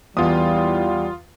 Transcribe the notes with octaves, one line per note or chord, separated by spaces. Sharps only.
E2 E3 G3 F4 D#6